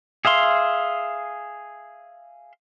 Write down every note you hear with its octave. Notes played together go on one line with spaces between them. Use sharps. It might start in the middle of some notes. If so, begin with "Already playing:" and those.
G#4 E5 F5 C6